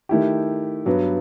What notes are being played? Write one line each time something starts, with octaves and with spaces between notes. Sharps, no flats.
D#3 A3 E4 G4
G2 F#3 B3